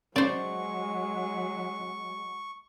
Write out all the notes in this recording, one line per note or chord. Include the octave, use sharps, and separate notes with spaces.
C#3 F#3 G#3 C5 D5 C#6